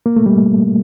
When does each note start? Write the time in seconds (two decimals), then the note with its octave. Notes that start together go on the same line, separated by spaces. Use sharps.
0.06 A#3
0.16 A3
0.26 G3